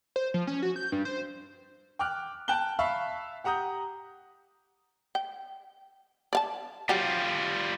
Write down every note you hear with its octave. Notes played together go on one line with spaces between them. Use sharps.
C5
F3
C#4
F#4
G6
G2
C5
G5 D6 F6 F#6
G5 A5 F#6 G7
E5 F5 A5 B5 C#6
G4 F#5 A#5 D#6 G6
G5
D5 F5 A5
F#3 G3 F4 G4